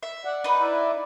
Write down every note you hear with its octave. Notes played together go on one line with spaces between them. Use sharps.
E5
D5 F#5
D#4 B4
E4 D5 E5